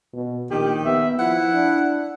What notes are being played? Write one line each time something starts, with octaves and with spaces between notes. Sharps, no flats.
B2
A#1 D#3 G4
B3 E5
F3 E4 F#5
D4